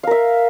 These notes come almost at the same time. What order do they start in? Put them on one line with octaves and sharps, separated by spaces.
F5 A#4 E5